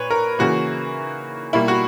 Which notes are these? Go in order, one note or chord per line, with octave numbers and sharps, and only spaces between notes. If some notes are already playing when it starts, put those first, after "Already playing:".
Already playing: A#2 B4 C#5
A#4
C#3 E3 A#3 F#4
B2 G3 A#3 E4
F#4